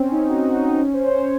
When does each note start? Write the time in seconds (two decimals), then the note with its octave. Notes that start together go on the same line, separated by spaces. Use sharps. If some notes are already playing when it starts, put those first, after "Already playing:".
Already playing: C4 C#4
0.11 D#4
0.28 F#4
0.54 D#4
0.80 C#4
0.93 C5
1.06 C#5